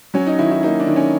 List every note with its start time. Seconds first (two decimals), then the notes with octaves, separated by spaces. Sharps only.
0.14 F#3 C#4
0.27 D#4
0.39 D#3 E4
0.51 E4
0.63 A#3 D#4
0.80 D4
0.87 D#3
0.96 C#4